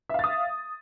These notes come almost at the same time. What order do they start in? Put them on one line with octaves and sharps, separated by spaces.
E5 F5 A6 D#6